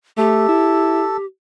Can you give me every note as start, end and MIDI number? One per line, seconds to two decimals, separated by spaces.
0.18 0.48 57
0.18 1.26 67
0.18 1.17 69
0.48 1.05 64